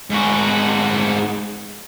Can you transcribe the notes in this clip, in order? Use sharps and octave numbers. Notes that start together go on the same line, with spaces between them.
G#2 F#4